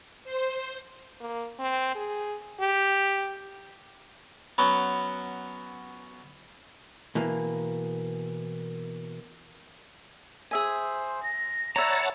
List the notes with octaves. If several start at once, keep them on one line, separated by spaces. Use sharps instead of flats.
C5
A#3
C4
G#4
G4
F#3 B3 C#4 B5
B2 E3 A#3
G#4 C5 E5 G#5
A#6
B4 C#5 D5 E5 F#5 A5 A#5